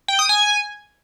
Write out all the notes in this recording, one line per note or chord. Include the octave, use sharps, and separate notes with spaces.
G5
D#6
G#5